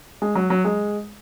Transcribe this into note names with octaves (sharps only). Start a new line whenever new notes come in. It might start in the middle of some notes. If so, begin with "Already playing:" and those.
G#3
F#3
F#3
G#3